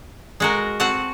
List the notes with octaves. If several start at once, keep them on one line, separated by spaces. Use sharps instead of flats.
G#3 F#4 A#4
C4 F#4 F#5 A5